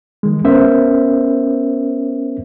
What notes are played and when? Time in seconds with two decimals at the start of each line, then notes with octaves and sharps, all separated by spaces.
0.23 D#3 G#3
0.44 B3 C#4 A#4 C5 E5